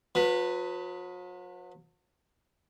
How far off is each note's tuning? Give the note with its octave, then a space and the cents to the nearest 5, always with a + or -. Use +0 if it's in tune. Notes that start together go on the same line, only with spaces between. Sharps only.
F#3 -45 B4 -5